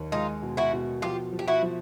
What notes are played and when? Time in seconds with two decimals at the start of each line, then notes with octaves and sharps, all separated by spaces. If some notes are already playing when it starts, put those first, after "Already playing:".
Already playing: D#2
0.12 G#3 D#4 F4
0.42 B2
0.57 E4 F#4
0.73 B2
1.02 F3 F4 G4
1.32 F3
1.39 G4
1.48 E4 F#4
1.63 F3